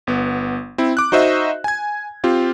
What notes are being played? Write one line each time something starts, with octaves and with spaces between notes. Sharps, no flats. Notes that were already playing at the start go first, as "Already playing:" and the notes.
G1 B3
C4 E4
D6 F#6
D#4 F#4 C5 D#5 E5
G#5 G#6
C4 F4 G4